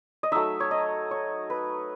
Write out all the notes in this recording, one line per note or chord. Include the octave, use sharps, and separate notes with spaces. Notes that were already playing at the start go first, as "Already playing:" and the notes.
D#5
F#3 A3 D#4 E5
C#5
D#5
C#5
B4